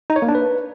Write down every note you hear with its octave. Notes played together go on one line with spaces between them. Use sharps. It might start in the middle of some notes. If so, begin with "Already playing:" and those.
D#4
C#5
A#3
D4
B4